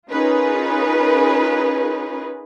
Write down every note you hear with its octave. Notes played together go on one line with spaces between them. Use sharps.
C#4 D#4 F4 G#4 A#4 B4